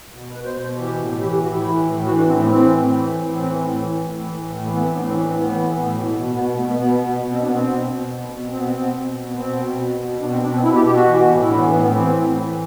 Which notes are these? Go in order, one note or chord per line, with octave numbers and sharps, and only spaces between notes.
B2
B2 B4
C5
B2 C5
E3 G4
A2
E3 G4
G4
A2 F#4
E4
E3
A2
E3 F#4
D4
A2 C4
C4
E3 C4
A2
E3
A2
E3 C4
A2
E3
A2
E3
A2
E3 A3
B3
A2 C4
D4
E3 C4
D4
A2 C4
B3
E3
A2
B2
B2
B2 B3
B3
B2 A3
B3
B2 B3
B2
B2
C4
B2 D4
B3
C4
B2
B2
B2
B2
B2 C4
B3
B2 C4
B2
B2
B3
B2 C4
B2
B2
B2
B2 D4
C4
B2 D4
C4
B2 E4
G4
B2 G4
F#4
E3
A2
E4
E3 D4
B3
A2 B3
B3
E3 C4
A2
E3